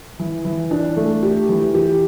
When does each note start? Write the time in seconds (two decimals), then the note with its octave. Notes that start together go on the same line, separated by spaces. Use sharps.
0.19 E3
0.45 E3
0.71 D4
0.97 A3
1.23 G4
1.49 E3
1.74 G4